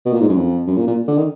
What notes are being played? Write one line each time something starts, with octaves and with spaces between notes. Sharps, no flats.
B2
A#2
G#2
F#2
F2
F#2
A#2
A#2
D3
D#3